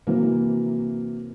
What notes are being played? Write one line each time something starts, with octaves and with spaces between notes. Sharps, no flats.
C3 E3 F#3 A#3